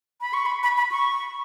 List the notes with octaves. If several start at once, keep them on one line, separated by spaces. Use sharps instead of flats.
B5
C#6
B5
B5
B5
C#6